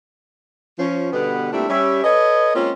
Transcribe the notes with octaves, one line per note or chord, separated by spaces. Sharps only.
F3 C#4
B2 D3 G3 B3 B4 F#5
A#2 G3 A3 C4 D4 E4
G3 C#4 E5
A4 B4 C#5 D#5
G#3 A#3 C4 C#4 F4